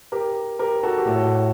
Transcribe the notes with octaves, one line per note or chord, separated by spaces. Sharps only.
G4 A#4
G4 A#4
F#4 A4
G4
A2 F#4 A4